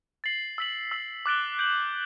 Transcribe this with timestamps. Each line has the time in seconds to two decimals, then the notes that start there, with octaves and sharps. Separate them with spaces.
0.24 A6 C7 F#7
0.58 E6 B6 F#7
0.91 E6 B6 F#7
1.26 D6 F#6 A6 D7 G7
1.59 G6 D7 F#7